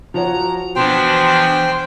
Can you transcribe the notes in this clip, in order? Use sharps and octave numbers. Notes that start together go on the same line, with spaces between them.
F3 F#4 C#5 A#5
B2 E3 F3 D4 C5 G5